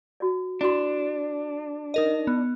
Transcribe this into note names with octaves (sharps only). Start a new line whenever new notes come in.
F#4 D5
D4 E4 F#4 C6
D#4 A#4 D#5
B3